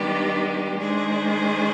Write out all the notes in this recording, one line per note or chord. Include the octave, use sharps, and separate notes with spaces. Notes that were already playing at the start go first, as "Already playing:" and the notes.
Already playing: D#3 G3 B3 D4 G4
D#3 G#3 D4 G#4 C5